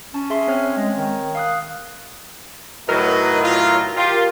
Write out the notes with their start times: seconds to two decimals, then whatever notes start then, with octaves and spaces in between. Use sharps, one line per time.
0.14 C#4 A5
0.30 G#4 E5 C6
0.47 C4 C#5 F6
0.77 G#3
0.96 D#3
1.35 F5 D#6 F#6
2.89 A2 D#3 F#3 F#4 A#4 B4 D#5
3.43 F4
3.97 F4 G4